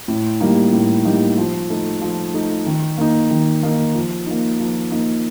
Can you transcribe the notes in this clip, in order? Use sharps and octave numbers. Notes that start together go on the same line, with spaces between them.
A2
G3 A#3 D#4
A2
G3 A#3 D#4
F3
A3 D#4
F3
A3 D#4
D#3
A#3 D#4
D#3
A#3 D#4
F3
A#3 D#4
F3
A#3 D#4